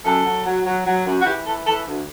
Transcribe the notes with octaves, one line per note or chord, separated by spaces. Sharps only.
F#2 A4
F#3
F#3
F#3
F#3
F#2
F#4
E3 G4
E3 A4
E3 A4
D2